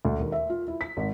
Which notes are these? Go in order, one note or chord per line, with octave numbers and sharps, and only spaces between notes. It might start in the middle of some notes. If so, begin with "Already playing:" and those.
D2
D#2
E5
F4
E4
B6
G#1